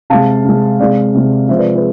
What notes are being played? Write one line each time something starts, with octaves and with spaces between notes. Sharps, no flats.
C3 G#3 F5 A5
C3 G#3
C3 G#3 D5 F5
C3 G#3
C3 F3 G#3 C5 E5
B4 D5
G#4 B4